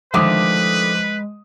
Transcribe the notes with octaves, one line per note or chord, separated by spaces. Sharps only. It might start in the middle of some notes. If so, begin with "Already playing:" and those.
D3 D#3 F3 G#3 A3 B4 D6 D#6